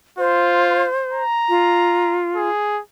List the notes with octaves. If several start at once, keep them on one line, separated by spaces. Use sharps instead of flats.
F4 C5
A#5
F4
G#4